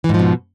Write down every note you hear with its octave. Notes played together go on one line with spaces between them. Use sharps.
G#2 B2 E3 F3